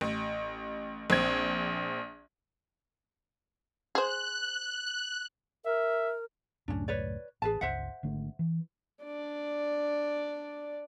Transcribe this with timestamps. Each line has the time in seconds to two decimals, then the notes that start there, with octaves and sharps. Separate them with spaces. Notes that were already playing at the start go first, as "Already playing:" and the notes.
0.01 A1
1.10 A#1 C4 G#6
3.95 G#4 C5 F#6
5.65 A#4 E5
6.68 C#2 F#2 A2 C#4 D4
6.88 B4 C#5 D5
7.42 A1 G#4 B4 A5
7.61 G1 C#2 C5 E5 F#5
8.03 G#1 D3 A3
8.39 E3
9.04 D4 D5